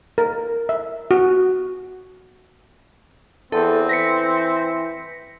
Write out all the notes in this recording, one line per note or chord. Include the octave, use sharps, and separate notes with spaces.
A#4
E5
F#4
E2 C4 A4
E3 A#6 B6 C#7